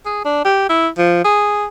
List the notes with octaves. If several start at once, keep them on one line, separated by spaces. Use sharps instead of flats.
G#4
D4
G4
E4
F3
G#4